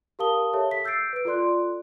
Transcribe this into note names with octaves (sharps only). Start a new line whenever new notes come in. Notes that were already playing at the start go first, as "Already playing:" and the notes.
G4 A#4 F5 A5 D#6 G7
G4 A4 C#5 E5 A5
B6
E6 G6 A6 C7 D7
B4 D7
F4 A4 D5 C6 F#6